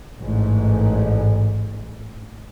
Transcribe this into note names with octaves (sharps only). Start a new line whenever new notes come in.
A1 G#2